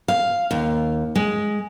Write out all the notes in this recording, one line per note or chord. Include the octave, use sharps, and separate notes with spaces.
F5
D#2
G#3